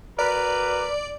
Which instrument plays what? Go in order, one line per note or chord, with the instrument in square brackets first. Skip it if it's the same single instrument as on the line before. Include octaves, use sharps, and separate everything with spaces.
[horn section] F#4 A#4 B4 [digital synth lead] D5